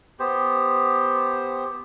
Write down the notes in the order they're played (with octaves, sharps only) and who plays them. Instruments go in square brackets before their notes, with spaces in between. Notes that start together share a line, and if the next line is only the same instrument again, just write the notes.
[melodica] B3 G4 C5